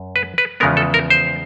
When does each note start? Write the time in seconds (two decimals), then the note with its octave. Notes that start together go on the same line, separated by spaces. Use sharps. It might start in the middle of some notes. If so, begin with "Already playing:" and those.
Already playing: F#2
0.16 B4
0.38 B4
0.60 E2 C#3 F3 G#3 B3 A#4
0.77 A4
0.94 A#4
1.10 C5